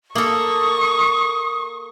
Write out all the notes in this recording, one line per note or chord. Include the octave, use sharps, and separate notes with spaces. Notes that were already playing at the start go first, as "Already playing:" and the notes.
A#3 A4 C#6 D#6